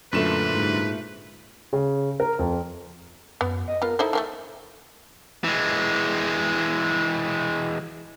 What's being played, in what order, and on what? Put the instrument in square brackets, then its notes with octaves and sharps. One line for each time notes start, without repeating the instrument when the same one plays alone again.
[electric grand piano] F#2 D3 E7 [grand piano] A#2 A3 [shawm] B4
[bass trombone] G#2
[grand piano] C#3
A#4
F2
[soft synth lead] F#2 [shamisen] B3
[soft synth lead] D#5
[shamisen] B3 F4 [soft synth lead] A#4
[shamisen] D#4 E4 C5 [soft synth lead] A4
[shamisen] D#3 F3 A3
[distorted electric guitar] E3 G#3